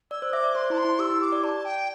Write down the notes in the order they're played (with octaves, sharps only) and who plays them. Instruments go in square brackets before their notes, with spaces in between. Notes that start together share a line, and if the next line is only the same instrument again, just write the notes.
[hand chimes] D5 [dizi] E6
[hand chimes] C5
[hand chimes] E5 [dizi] D6
[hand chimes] D5
[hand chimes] C5 [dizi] C6
[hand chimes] E4 [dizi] A5
[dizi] C6
[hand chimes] E4
[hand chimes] G4 [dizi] E6
[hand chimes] E4
[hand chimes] G4 [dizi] D6
[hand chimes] D5
[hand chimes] D5 [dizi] A5
[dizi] G5